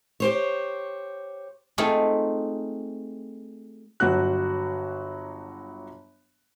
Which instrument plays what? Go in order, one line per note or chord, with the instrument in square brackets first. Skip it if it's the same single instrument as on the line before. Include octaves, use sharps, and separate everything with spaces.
[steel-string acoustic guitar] G4 C5 C#5
[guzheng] A3 C4 D#4 F4 G#4
[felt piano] G1 F#3 F#4 F#6